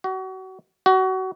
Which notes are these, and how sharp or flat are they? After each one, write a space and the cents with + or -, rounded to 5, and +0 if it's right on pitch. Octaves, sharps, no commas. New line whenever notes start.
F#4 +30
F#4 +25